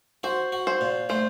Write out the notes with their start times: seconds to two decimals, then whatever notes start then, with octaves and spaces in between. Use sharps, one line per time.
0.23 F#4 C5
0.52 F#4
0.67 C5
0.81 A#2
1.09 A3 C5